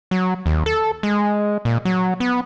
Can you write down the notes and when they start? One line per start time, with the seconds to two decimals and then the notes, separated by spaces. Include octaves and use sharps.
0.11 F#3
0.46 D#2
0.66 A4
1.03 G#3
1.65 A#2
1.85 F#3
2.20 B3